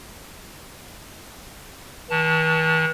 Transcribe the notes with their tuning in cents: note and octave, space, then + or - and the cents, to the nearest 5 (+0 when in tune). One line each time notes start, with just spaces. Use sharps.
E3 -45 A5 +0